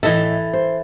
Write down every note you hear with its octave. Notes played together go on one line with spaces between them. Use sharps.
A2 E3 A4 D#5 E5
C5